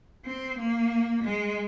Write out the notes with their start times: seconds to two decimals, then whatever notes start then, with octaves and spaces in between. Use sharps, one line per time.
0.25 C4
0.59 A#3
1.23 G#3